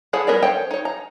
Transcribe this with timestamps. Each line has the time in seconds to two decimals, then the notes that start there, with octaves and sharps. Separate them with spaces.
0.13 E4 G#4 A4 C#5 F#5
0.27 G3 B3 A#4 C#5 D5
0.43 A4 C5 C#5 G5
0.71 D#4 C#5
0.85 A#5